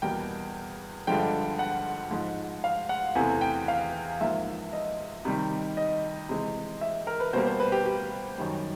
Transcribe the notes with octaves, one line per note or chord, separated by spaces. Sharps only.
E2 B2 G3 A#3 G5
G2 D3 F3 G#3 G5
F#5
G#2 F3 G#3
F5
F#5
E2 C3 E3 A3 G#5
G5
F5
G#2 F3 A#3 E5
D#5
C3 D#3 G3
D#5
C3 E3 G#3
E5
A#4
B4
B2 G3 A#3 C5
C5
B4
G4
G4
F#2 D#3 G3